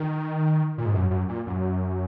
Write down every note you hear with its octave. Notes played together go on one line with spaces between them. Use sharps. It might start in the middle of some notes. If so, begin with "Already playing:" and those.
Already playing: D#3
A#2
G#2
F#2
F#2
A#2
F#2